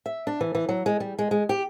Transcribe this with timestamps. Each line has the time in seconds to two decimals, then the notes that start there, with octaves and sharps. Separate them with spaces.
0.06 E5
0.27 D4
0.41 E3
0.55 E3
0.69 F#3
0.86 G#3
1.00 G3
1.19 G#3
1.31 G#3
1.49 G4